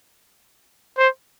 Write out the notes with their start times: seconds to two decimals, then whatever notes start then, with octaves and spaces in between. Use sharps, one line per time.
0.98 C5